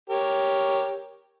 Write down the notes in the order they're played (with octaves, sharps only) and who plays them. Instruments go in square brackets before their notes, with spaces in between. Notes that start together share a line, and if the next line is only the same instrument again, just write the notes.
[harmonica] G4 A#4 C#5